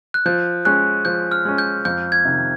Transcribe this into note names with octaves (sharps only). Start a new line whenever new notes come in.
F#6
F3 G6
G#3 C#4 F#6
F3 G6
F6
G#3 C#4
G6
F2 G6
G#6
C3 D#3